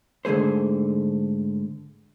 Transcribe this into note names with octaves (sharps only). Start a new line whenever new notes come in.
G#2 D3 A3 G#4 C5